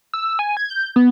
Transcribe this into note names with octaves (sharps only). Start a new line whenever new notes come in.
E6
G#5
G#6
G6
B3